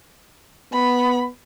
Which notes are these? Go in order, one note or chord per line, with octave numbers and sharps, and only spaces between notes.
B3 B5